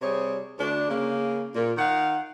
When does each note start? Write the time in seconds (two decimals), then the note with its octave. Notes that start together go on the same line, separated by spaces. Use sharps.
0.02 C3 G3 G#4 C#5
0.59 D2 D4
0.89 C#3 A#3
1.55 A#2
1.78 D#3 F5 F#5